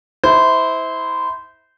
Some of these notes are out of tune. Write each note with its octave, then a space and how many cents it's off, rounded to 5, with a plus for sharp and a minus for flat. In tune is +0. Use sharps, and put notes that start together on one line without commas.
E4 -25 C5 -20